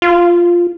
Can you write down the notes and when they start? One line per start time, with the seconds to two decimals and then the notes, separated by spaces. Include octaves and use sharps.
0.02 F4